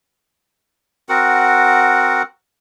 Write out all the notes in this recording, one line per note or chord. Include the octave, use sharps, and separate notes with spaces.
C4 F#4 A#4 F#5